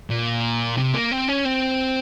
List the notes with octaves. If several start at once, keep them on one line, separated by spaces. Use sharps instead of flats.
A#2
C3
A#3
C4
C#4
C4